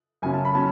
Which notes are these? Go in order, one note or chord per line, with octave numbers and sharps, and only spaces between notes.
F#2 C#3 F#3 C#4 G#5
A5
B5
F#3 C#4 A5